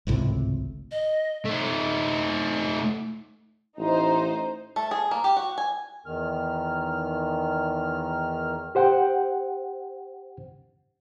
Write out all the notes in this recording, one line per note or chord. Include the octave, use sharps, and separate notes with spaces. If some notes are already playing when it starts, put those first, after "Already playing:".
G#1 C#2 A2 C3
D#5
A3 D#4
A1 D#4 C5
A3
G#4
A#3
G4
F#4
G#5
E2 D#3 F6
G4 C5 F#5 G5